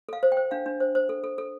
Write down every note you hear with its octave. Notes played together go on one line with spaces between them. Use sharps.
A4 F5
C5
G5
C5
D4 F5
D4
C5
C5
A4
A4
A4